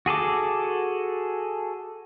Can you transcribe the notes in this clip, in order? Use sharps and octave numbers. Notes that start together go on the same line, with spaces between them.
F#4 G#4 A4 D6